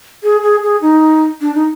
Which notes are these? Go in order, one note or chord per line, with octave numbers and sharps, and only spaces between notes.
G#4
G#4
G#4
D#4
D4
D#4